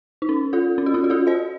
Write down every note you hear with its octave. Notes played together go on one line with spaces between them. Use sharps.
D#4
C#4
F4 A4
C#4
F#4
C#4 F4
F#4
F4 A4
C5 D#5